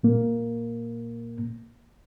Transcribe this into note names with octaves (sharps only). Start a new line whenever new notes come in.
A#2 A#3